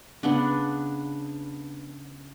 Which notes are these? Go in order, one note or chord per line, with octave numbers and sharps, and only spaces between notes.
C#3 B3 D4